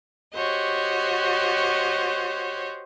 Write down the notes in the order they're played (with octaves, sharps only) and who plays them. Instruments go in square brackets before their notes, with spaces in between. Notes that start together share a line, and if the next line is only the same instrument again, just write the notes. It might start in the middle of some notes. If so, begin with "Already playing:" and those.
[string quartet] F#4 G4 C5 C#5 D#5